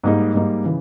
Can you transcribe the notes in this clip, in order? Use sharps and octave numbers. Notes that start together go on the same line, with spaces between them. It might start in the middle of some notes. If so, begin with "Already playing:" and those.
G#2 G3 A#3 D#4
G#2 G3 A#3 D#4
C#3 E3